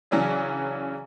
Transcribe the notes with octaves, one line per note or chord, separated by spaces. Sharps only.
C#3 E3 F#3 C#4 D4 G#4